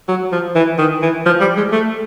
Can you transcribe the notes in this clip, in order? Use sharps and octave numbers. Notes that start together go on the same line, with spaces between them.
F#3
F3
E3
D#3
E3
F3
G3
G#3
A3